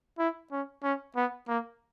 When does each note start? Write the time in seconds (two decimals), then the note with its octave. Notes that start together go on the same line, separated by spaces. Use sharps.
0.19 E4
0.52 C#4
0.83 C#4
1.16 B3
1.48 A#3